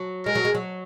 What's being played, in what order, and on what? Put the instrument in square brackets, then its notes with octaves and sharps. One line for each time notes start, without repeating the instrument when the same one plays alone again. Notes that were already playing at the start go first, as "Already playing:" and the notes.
Already playing: [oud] F#3
[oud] G#3 [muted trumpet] A#4
[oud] F#3
G#3
F#3